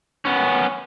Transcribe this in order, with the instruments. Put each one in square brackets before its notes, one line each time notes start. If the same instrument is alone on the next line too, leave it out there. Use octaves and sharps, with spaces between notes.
[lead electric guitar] B3 C#4